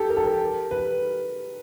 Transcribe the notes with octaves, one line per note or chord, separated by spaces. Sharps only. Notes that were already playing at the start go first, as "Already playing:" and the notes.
Already playing: G4 A4
A#4
A4
A#4
B4